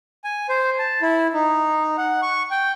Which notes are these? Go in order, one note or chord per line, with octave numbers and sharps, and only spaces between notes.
G#5
C5
A5
E4
D#4
F#5
C#6
G5